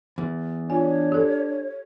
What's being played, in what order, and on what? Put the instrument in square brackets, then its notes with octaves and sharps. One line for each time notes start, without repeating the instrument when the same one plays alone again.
[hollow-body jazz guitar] E2
[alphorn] D4 [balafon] F4 G#5 [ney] C#5
[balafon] G4 A4